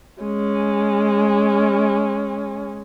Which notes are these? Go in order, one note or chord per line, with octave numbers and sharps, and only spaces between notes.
G#3 C#4